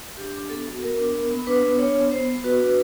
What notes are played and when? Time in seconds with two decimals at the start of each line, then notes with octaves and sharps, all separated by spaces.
0.18 D4 G4
0.33 D4
0.49 B3 A4
0.67 F#4
0.82 B3 A#4
0.98 D4
1.14 B3
1.31 B3
1.47 D4 B4
1.63 B3
1.79 D4 C#5
1.95 B3
2.11 B3 C5
2.27 B3
2.44 F#4 B4
2.60 D4